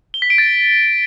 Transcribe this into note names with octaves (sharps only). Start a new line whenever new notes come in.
G7
B6
D7
A6